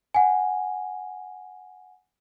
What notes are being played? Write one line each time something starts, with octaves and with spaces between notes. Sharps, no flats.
F#5 G#5